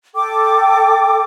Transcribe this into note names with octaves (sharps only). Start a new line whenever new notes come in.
A4 G5 D6